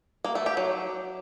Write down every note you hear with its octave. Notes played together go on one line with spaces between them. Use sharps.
A#3
A3
G4
F#3